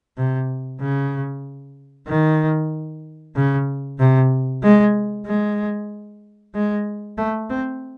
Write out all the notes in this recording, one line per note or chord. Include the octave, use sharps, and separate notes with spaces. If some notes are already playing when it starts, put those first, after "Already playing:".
C3
C#3
D#3
C#3
C3
G#3
G#3
G#3
A3
C4